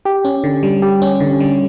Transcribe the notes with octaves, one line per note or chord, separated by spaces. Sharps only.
G4
C#4
D3
G3
G4
C#4
D3
G3